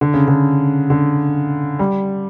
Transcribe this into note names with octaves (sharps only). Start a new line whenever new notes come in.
D3
C#3
D3
D3
G3